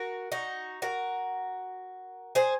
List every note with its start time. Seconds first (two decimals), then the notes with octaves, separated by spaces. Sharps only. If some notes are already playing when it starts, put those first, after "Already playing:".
Already playing: F#4 A#4
0.32 D#4 F#4
0.82 F#4 A#4
2.35 G#4 C5